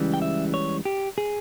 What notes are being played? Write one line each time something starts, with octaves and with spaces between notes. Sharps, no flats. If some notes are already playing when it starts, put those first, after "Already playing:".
Already playing: C#2 C#3 E3 G3
G5
E5
C#5
G4
G#4